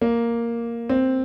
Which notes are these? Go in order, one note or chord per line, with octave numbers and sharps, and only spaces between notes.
A#3
C4